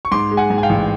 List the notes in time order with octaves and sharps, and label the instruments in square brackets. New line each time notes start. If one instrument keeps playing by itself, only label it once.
[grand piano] C#6
G#2 C6 D6
G#3
F#5 G#5
G#2
G#5
F5 G5
A1